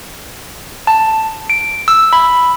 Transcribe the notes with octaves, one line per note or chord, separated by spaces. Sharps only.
A5
D7
E6
B5